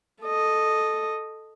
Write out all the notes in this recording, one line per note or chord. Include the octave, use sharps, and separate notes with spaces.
A4 D#5